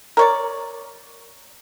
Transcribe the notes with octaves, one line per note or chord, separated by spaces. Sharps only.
A#4 C#5 D5